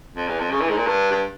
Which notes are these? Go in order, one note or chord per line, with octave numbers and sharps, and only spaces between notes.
F2
E2
F2
C#3
E3
G#2
A#2
G2
G2